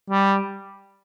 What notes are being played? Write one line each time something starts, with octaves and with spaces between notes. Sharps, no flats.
G3